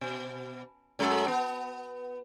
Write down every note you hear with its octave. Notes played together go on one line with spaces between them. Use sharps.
B2
F#2 G#3 A4
B3